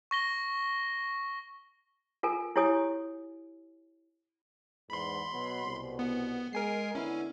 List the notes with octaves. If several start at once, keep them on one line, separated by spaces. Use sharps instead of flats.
C#6 A#6 G7
F4 A4 A#4 G#5
E4 G4 C#5 G#5 D#6
E2 G#2 B5 C6
B2 F#3 B3
C2 B2
B3
G#3 A#4 G#5 C7
D3 B3 C#4 E4